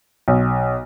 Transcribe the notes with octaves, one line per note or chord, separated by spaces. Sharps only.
B1